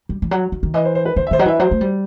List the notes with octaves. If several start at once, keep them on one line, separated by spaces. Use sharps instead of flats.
G3
E3
F#3
D#3
D#3
E3 D#5
C5
C5
B4
D#3 C5
E5
D#3 C5
F#3 D#5
E3 E5
F#3 C5
A3
G3